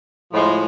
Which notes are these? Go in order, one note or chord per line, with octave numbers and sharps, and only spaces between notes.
A2 F3 G#3